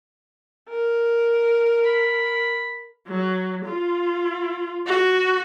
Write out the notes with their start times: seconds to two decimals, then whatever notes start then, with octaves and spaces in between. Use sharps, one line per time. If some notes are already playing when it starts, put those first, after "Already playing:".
0.69 A#4
1.85 B5
3.08 F#3
3.65 F4
4.86 F#4